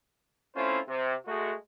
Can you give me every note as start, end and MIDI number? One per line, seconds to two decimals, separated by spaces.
0.55 0.79 57
0.55 0.79 60
0.55 0.79 61
0.55 0.79 64
0.55 0.79 65
0.55 0.79 72
0.88 1.14 48
1.26 1.54 56
1.26 1.54 57
1.26 1.54 66